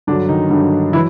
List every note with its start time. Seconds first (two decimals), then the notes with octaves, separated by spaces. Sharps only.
0.07 G2 D3 F#3 D4
0.29 D#3 D#4
0.50 G2 D3 F#3
0.93 E3 F#3 E4